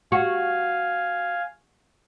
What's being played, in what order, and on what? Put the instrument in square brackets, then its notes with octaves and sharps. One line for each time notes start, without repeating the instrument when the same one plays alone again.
[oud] F#4 [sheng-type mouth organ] F5 G#5